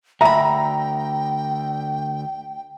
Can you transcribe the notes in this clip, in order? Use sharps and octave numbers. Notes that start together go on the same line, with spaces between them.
D2 E5 G5 A#5 B5